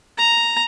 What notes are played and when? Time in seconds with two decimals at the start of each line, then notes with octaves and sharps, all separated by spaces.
0.18 A#5